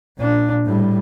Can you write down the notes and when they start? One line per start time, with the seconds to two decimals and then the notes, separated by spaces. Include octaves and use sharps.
0.17 A#2 D4
0.65 A2 G3